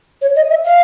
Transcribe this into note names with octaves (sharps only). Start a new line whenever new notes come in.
C#5
D#5
E5
F5